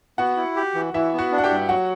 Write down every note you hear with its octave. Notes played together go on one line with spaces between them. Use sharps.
B3 F#4 F#5
E4
G4
E3
E3 E4 E5
B3
F#4 F#5
D4
F#5
G4 G5
G2
F#3 F#4 F#5